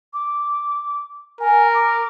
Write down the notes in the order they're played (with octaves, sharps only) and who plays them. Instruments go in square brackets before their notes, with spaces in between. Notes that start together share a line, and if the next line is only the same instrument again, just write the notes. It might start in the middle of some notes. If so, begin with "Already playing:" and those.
[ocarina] D6
[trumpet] A#4 [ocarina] G#5
[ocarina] D6